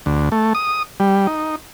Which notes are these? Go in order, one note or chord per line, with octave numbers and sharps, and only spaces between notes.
D2
A3
D#6
G3
D#4